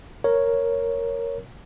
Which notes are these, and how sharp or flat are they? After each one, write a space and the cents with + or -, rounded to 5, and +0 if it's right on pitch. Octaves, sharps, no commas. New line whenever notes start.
A#4 +0 C#5 +0